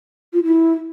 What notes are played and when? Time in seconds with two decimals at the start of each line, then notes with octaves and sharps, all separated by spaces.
0.33 F4
0.44 E4